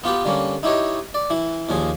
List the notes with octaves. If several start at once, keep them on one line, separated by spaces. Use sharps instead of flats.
B3 F4 G4 B4
D3 G3 A#3 C#4
D#4 E4 G4 C#5 D#5
D5
E3 E4
D#2 A#2 F3 G#4